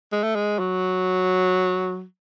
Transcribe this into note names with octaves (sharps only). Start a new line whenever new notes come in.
G#3
A3
G#3
F#3